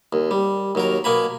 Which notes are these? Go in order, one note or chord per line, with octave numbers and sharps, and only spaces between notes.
D#2
G3
D#2 F#3 A#4
B2 A#3 G#5 B5